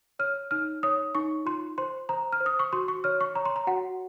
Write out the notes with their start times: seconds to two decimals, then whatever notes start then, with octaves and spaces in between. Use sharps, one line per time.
0.19 C#5 F6
0.51 D#4 F6
0.83 C#5 D#6
1.15 D#4 C#6
1.46 F4 C6
1.78 C5 C6
2.09 C5 A#5
2.33 F6
2.40 C5
2.46 D#6
2.59 C#6
2.73 F#4 C6
2.88 C#6
3.04 C#5 F6
3.21 C#6
3.35 C#5 A#5
3.45 C6
3.56 A#5
3.67 F#4 F#5